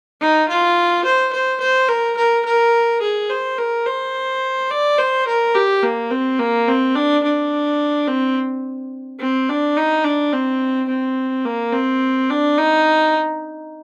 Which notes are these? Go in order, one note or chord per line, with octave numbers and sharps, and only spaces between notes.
D#4
F4
C5
C5
C5
A#4
A#4
A#4
G#4
C5
A#4
C5
D5
C5
A#4
G4
A#3
C4
A#3
C4
D4
D4
C4
C4
D4
D#4
D4
C4
C4
A#3
C4
D4
D#4